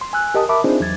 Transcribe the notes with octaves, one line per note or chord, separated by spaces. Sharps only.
C6
G#5 E6 F#6
G4 A#4 D#5 G5 A5 D#6
A#4 E5 A5 B5 D6
C4 D4 D#4 F4 G#4 C5
E2 F#3 G#6 A6